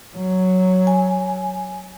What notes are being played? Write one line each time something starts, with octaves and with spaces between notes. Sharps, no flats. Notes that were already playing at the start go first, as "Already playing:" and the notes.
F#3
G#5